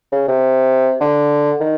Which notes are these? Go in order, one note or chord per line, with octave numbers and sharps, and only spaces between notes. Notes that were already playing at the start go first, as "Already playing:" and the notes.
C#3
C3
D3
D#3